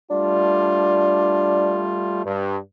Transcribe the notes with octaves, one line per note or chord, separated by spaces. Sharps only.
G3 A3 D4 F4
G2